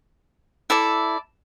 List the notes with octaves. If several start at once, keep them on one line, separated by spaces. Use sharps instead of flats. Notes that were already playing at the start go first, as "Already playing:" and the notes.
E4 A4 D5